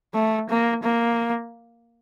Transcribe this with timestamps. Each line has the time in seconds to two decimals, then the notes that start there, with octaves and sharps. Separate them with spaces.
0.14 A3
0.49 A#3
0.83 A#3